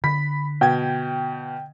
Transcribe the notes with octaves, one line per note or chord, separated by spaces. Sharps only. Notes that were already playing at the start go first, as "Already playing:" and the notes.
D3 B5 B6
B2 G5 G#6